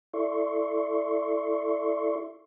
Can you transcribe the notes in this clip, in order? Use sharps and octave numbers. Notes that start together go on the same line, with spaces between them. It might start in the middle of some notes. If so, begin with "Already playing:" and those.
E4 A4 D5 E5 C6 C#6